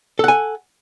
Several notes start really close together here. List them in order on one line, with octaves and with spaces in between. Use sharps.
A4 F#5 G#5